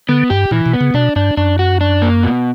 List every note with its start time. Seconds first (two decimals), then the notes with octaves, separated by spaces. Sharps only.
0.09 D3 B3
0.30 G2 G4
0.51 A#2 E3
0.66 B2
0.73 B3
0.81 C#3
0.94 B2 D4
1.16 G2 D4
1.37 F#2 D4
1.59 F#4
1.81 D4
2.02 A#3
2.23 B2